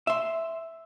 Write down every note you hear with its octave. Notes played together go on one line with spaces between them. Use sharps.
E5 C6